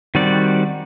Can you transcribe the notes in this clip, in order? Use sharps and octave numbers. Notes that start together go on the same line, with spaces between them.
D#3 G3 C4 F#4 D5